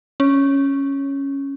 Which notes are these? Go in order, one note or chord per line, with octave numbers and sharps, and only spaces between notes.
C#4